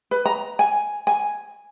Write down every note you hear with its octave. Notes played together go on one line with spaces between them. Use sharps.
B4
A#5
G#5
G#5